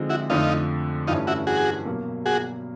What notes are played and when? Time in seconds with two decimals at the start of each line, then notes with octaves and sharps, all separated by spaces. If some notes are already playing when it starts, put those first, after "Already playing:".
Already playing: D3 F3 G#3 C4 D#4
0.10 E4 F#4
0.29 F2 D3 F3 A3 D#4 F4
1.07 G2 E3 A3 C#4 D#4 F4
1.27 E4 F#4
1.47 F#4 G#4
1.86 B2 F#3 A#3
2.26 F#4 G#4